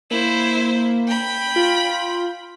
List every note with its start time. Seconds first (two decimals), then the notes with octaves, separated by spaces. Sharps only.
0.11 A#3 E4 C5
1.08 G5 B5
1.56 F4